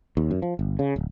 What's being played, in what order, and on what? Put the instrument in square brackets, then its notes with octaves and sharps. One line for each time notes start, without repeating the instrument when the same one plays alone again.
[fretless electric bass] D#2
F#2
F3
G1
C#3
D1